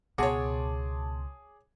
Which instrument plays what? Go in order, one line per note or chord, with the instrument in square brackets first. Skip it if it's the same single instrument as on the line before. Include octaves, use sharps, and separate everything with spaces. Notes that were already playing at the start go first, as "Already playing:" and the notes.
[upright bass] C#2 [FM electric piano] B2 A5 C6 [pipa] F#4 C#5 [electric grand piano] G#4 D6